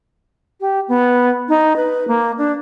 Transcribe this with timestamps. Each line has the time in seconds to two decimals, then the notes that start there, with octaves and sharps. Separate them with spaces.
0.61 G4
0.88 B3
1.49 D#4
1.76 B4
2.08 A#3
2.38 D4